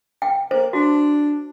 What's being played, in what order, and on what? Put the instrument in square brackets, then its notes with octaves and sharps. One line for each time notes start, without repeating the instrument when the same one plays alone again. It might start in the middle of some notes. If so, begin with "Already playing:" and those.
[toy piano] G5
[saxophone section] A#3 [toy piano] C5
[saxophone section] D4 [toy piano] F#4